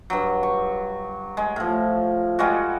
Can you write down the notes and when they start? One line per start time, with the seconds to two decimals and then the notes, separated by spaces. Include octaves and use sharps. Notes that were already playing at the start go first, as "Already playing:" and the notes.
0.10 G2 F#3
0.43 C#6
1.37 G#3
1.56 A2 F3
2.39 G3 G#3 F#4